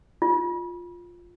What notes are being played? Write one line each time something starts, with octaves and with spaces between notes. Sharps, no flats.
F4